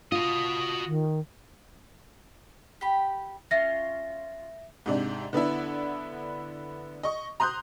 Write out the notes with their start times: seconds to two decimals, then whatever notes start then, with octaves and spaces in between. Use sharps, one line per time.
0.12 F4 F#4 D#5
0.86 D#3
2.81 G4 B5
3.51 C#4 F4 E5 A#6
4.86 G#2 C3 D4
5.33 D3 B3 D4 E4
7.03 D#5 C#6
7.40 A#5 C6 D#6 F#6 G6